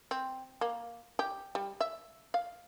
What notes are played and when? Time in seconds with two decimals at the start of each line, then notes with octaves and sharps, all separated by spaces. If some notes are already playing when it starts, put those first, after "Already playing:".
0.11 C4
0.61 A#3
1.19 G4
1.55 G3
1.81 E5
2.34 F5